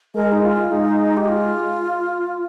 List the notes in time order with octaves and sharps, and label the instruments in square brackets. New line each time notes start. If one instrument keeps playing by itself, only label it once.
[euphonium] G#3 [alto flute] A#4
[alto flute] D#4
F4
[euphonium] G#3 [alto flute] D#4
[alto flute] G4
F4